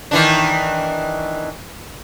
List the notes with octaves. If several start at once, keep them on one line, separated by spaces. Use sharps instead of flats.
D#3 E3 D4